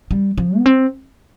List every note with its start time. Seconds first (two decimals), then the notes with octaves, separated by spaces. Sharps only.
0.11 G3
0.38 F3
0.57 B3
0.66 C4